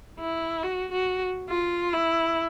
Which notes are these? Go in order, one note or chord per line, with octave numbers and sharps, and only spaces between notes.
E4
F#4
F#4
F4
E4